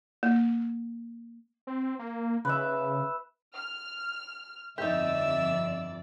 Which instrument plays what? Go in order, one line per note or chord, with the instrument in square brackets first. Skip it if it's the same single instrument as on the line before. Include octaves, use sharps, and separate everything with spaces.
[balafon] A#3
[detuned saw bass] C4
A#3
[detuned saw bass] C#3 [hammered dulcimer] B4 E5
[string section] F6
[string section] G1 F2 D5 [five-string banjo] D#4 G4 [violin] E5 E6